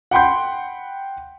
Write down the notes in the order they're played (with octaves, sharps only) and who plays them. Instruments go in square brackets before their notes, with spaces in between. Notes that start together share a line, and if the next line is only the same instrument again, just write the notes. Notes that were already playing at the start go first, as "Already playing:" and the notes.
[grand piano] F#5 G5 B5 C6 G6